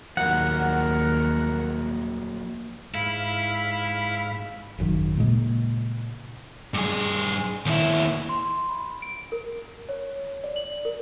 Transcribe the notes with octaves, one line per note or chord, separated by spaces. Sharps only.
D#2 F3 F#3 A#3 A#4 F#5
G#2 E4 F5 B5
G#1 F#2 D#3
A#2 C#3 G#3 A#3
G2 G#4
D#2 E4
C6
B5
D7
A#4
C#5
D5
F#7
A#4